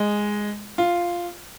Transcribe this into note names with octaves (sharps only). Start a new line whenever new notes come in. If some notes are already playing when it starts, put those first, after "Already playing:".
Already playing: G#3
F4